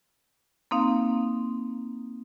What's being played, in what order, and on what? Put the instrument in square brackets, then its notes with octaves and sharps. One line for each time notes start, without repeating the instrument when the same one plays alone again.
[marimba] A#3 C4 D#4 F5